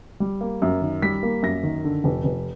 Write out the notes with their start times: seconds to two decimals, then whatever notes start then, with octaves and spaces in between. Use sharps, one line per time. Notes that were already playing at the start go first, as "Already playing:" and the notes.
0.20 G3
0.41 A#3
0.62 F#2
0.82 D#3
1.02 G3 B6
1.23 A#3
1.43 F#2 A#6
1.63 D#3
1.85 D3
2.04 F1
2.24 F1